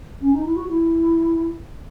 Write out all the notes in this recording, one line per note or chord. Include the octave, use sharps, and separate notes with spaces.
C#4
D#4
E4
F#4
E4